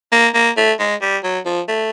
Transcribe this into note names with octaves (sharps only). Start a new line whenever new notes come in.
A#3
A#3
A3
G#3
G3
F#3
F3
A3